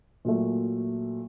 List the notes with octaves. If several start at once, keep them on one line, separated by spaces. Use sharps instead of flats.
A#2 F#3 A3